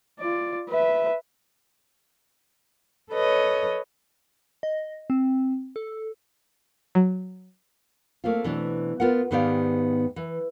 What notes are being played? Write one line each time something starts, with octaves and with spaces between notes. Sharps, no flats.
F4 D5
B4 E5
A4 B4 C#5 D#5
D#5
C4
A4
F#3
A3 A#3 C4 F4
B2 E3 C4 D4
B3 F4 A#4 F#5
G#2 D#3 B3 G4 D5 F5
E3